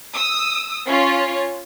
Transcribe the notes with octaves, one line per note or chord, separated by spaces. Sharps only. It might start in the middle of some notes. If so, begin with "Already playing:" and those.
D#6 E6
C#4 F4 C#5